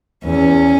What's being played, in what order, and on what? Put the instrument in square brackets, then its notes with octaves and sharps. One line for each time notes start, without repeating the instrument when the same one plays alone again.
[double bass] E2 [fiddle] C#4